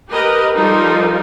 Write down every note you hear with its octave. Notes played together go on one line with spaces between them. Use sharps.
G4 A#4 B4 D#5
F3 G3 D#4 F4 A4 A#4